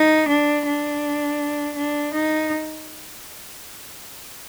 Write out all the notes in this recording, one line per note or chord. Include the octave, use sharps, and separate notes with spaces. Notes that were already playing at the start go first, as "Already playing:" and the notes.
Already playing: D#4
D4
D4
D4
D#4